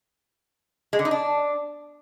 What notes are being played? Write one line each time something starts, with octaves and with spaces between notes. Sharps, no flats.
G#3
D3
D#4
D4